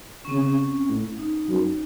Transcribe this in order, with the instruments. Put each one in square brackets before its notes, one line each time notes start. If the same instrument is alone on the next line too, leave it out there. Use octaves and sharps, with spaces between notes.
[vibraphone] C#4
[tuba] C#3 [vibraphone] C4
[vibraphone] C#4
[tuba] A2
[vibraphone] D#4
[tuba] F#2